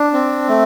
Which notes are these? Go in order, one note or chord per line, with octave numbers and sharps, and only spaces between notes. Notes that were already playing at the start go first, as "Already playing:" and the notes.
Already playing: D4
C4
A3